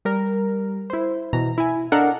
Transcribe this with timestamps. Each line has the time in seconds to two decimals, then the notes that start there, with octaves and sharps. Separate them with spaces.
0.05 G3 A#4
0.90 E4 C5
1.33 B2 E3 A#5
1.58 E4 G#5
1.92 D4 A4 A#4 D#5 F5 F#5